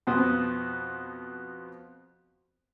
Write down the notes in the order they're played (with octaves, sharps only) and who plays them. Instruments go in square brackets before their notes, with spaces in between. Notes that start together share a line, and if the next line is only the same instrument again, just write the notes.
[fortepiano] F2 B2 B3 C5 D#6